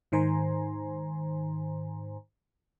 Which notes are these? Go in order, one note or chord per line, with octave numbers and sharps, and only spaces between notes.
G#2 D#3 C5 G#5 A#5 C6